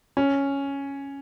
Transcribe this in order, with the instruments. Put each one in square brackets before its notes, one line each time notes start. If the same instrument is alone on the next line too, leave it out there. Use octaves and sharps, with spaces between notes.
[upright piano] C#4